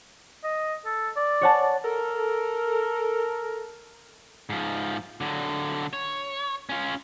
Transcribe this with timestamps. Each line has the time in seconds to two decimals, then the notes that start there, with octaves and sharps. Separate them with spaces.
0.44 D#5
0.85 A4
1.16 D5
1.41 C#5 F#5 A5
1.84 A4 A#4
4.49 G#2 F3
5.21 D3 F#3
5.93 C#5
6.69 C#4 F4